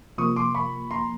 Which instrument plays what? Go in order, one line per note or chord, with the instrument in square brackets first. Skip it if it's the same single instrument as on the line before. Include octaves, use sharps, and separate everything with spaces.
[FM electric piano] C3 F3 A#3 [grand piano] C#6 D#6
[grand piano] C6 D6
B5 C#6
A#5 C6